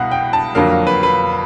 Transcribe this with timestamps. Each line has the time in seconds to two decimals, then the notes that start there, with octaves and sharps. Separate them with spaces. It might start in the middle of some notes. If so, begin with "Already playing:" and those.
Already playing: C2 B2 F5 F#5
0.11 G5
0.33 A5
0.55 F2 D3 F#3 A#3 F5
0.71 F5
0.87 B4
1.03 B4